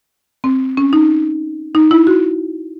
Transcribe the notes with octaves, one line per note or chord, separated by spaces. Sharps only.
C4
C#4
D#4
D#4
E4
F#4